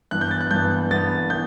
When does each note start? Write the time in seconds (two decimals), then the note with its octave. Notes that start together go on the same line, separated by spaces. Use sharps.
0.11 G2 E3 B3 F#6
0.21 G6
0.31 A6
0.41 F#6
0.51 G2 E3 B3 G6
0.91 G2 E3 B3 A6
1.30 E3 B3 G6